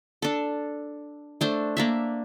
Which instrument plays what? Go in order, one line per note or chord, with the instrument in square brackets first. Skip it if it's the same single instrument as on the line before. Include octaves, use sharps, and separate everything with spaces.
[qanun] D4 A4
A3 D4 C5
A#3 D4 E5